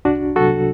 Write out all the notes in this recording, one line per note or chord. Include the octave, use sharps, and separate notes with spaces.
C2 D4 F#4
C3 F#3 F#4 A4